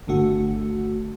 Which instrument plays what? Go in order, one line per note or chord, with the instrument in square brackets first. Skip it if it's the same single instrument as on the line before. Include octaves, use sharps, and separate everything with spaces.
[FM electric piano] G1 D3 A3 F#4